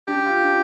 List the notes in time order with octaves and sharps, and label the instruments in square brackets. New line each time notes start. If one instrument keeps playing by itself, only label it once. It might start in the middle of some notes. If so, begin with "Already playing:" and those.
[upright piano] D4 [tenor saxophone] G4
[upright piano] F4
D4